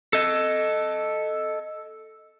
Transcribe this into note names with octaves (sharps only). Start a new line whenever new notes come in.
A4 D#5